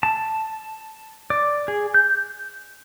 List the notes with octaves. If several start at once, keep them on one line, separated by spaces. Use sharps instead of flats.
A5
D5
G#4
G6